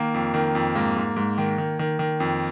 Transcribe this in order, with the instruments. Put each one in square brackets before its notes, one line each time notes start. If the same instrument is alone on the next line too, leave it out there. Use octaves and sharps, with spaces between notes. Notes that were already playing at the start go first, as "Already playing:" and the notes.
Already playing: [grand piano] D#3 A#3
F2
D#3
F2
G#2 A#3
G#2
G#2
D#3
D#3
D#3
D#3
F2